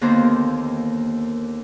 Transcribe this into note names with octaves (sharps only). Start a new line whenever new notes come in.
D#2 D3 D#3 A#3 B3 C5